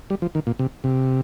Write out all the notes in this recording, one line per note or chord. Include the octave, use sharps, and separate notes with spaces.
G3
F3
D#3
A#2
C3
C3